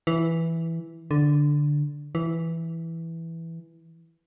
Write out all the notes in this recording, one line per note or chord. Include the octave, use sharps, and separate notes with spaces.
E3
D3
E3